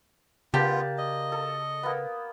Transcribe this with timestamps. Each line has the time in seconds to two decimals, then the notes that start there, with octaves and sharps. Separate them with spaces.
0.54 C#3 A#3 B3 F4 G4 D5 A5
0.98 D#5
1.32 A4
1.83 A#3 B3